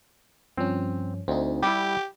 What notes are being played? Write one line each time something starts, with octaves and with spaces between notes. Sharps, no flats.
G2 F3 C4 C#4
D2 C4 D#4
G3 E4 G4 D6